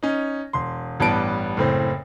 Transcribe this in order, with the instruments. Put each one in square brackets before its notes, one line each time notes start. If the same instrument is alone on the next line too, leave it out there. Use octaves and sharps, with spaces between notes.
[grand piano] C#4 D#4
E1 C6
A1 G2 B3 A5 D7
F#1 A2 C4